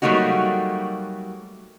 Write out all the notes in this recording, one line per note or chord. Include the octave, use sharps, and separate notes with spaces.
F#3 G3 A3 A#3 D#4 F#4